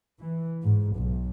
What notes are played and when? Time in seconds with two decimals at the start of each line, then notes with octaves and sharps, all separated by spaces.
0.22 E3
0.64 G#2
0.96 B1